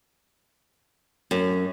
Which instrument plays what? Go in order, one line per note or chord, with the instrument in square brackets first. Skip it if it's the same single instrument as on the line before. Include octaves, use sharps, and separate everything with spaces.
[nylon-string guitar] F#2